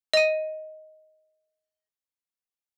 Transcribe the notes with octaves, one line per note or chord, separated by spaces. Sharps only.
D#5 D#7